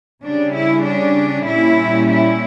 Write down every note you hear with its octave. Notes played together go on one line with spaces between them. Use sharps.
C#3 G3 C#4 D4
E4
D4
A#2 G3 C#4 E4
E4